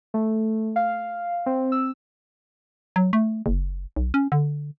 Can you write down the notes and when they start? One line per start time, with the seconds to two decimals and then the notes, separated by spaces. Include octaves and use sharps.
0.14 A3
0.76 F5
1.46 C4
1.72 E6
2.96 F#3
3.13 A3
3.46 F#1
3.96 B1
4.14 C#4
4.32 D3